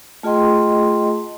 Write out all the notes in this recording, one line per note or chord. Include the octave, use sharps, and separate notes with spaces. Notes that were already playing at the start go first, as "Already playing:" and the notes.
A3 F4 G#4 D#5 G5 C6